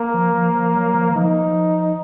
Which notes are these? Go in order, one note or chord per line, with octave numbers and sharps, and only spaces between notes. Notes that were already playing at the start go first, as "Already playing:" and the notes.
Already playing: A#3
F3
F3
F3
F#3
F3
E3
F3 D#4